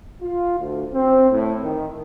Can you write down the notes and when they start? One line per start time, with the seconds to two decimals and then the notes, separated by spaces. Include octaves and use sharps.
0.22 F4
0.59 D2
0.93 C4
1.30 A2
1.62 D#3